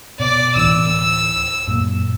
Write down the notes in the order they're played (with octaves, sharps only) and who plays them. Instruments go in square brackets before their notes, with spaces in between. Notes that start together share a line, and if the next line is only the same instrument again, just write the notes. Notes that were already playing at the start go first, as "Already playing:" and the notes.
[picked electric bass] B2 [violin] D5 D6
[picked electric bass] D1 E3 [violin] E6
[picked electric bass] F#2 A#2